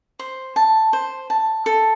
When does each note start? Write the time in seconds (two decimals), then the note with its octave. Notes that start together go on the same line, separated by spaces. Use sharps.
0.19 C5
0.56 A5
0.93 C5
1.30 A5
1.66 A4